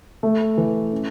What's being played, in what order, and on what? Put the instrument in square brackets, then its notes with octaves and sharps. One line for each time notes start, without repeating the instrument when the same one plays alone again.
[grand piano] A3
E3
C#4